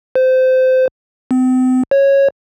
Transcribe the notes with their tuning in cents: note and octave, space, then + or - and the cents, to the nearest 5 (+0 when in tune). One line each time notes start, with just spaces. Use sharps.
C5 -20
C4 -40
C#5 -10